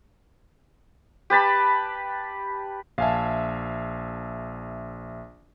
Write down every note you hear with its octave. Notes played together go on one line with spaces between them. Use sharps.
G4 B4 A5 B5
A#1 E5 F5 G#5 A5